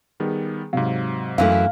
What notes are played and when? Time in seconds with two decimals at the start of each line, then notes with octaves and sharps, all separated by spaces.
0.20 D#3 G3 B3 G#4
0.73 G#2 C3 F#3 F5
1.38 F#2 E3 A3 F5